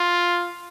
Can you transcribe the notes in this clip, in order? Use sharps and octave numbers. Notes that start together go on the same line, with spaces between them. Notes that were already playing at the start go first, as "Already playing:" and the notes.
Already playing: F4